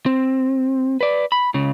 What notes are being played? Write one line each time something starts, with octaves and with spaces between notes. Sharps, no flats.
C4
B4 D5
B5
C#2 C#3